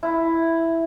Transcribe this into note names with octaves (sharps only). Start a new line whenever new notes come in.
E4